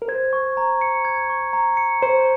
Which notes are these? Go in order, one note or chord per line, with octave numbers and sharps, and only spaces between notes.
A#4
C5 G#6
C#6
A#5
C#7
G#6
C#6
A#5
C#7
C5 C#7